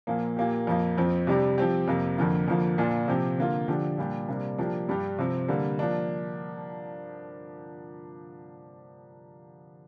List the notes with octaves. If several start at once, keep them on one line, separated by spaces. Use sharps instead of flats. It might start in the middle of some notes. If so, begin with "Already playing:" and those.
A#2 F3 A#3
A#2 A#3 G4
F2 F3 A#3
F2 F3 C4
C3 G3 D4 G4
F3 C4 G4
F2 C3 A#3
F2 D3 F3 A#3 F4
F2 D3 F3 A#3
A#2 F3 D4 F4
C3 F3 C4 G4
D3 A#3 F4
D3 F3 D4 G4
A#2 G3 D4 G4
C3 G3 A#3 D4
F3 A#3 D4 G4
G2 G3 D4 G4
C3 F3 C4
D3 G3 A#3
F3 A#3 D4